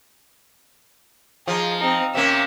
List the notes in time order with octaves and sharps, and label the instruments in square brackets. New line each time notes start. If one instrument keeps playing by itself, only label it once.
[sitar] F3 [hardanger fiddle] D#4 G#4
[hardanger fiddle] C4 D#4
[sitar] C3 A#3 [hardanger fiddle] C#4 E5